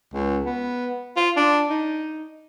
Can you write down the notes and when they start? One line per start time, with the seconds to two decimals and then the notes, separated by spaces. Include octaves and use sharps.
0.14 C#2
0.45 B3
1.17 F4
1.36 D4
1.70 D#4